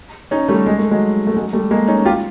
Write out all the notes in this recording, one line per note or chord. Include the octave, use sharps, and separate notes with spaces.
C#4 D#4
G3 A3
G#3
A3
F#3 G#3
A3
F#3 G#3
G3 A3
G#3 A#3
C#4 D#4
F4 G4